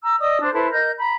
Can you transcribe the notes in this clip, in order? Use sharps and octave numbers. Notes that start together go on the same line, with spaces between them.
A#5 E6
D5 D#5 D#6 E6
D4 C5
E4 A4 B4 C5
A#4 D#5 G6
A#5 B5